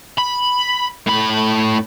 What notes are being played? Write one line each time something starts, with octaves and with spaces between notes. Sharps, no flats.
B5
A2 B5